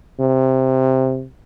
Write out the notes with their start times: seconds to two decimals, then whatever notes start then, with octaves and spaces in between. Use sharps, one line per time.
0.20 C3